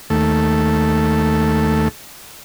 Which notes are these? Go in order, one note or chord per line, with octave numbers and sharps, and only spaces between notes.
D#2 A3